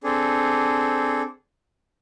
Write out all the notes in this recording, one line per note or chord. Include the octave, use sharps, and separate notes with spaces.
C4 D4 G#4 A4